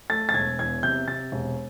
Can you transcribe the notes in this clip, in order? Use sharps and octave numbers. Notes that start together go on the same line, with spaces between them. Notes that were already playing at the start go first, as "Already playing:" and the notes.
A3 A6
A6
E1 G#6
E2 G#6
C3 G6
C3 A6
E1